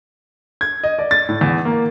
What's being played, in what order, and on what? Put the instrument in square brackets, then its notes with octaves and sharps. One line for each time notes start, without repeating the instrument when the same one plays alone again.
[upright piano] G#6
D#5
D5
A6
A2
E2
A#3